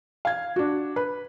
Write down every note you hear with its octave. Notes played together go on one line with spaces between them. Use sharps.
F5 G#6
D4 F#4
B4